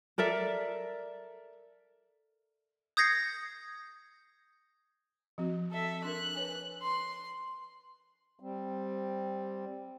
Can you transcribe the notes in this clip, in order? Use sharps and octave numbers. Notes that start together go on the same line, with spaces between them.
A4 A#4 D5 E5
D#6 G6 G#6 A#6 C7 C#7
F3 C4 F#4
A4 E5
D4 A#4 F#6
B4 C#5 G#5
C6
G3 C4